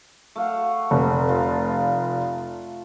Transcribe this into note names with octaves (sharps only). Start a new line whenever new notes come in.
A3 F5 F#5
F1
F4